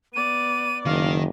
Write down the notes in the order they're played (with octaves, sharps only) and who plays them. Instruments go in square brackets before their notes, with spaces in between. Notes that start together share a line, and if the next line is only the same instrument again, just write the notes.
[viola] B3 D5 [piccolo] D#7
[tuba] F#1 [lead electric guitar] D#3 [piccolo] F5